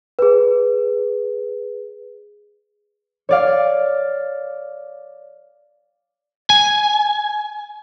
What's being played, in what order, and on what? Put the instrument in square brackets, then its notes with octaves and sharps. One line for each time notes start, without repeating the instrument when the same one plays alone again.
[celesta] G#4 B4
[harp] C#5 D5 F5
[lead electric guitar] G#5